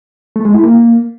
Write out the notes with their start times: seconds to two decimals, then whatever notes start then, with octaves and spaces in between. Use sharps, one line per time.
0.36 A3
0.45 G#3
0.54 E4
0.64 A#3